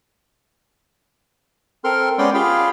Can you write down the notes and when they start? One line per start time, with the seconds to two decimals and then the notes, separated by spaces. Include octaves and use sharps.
1.84 C4 A4 A#4 C6 F6
2.18 G#3 B3 C#4 D5 G5 C6
2.34 F4 G4 G#4 F5 G5 B5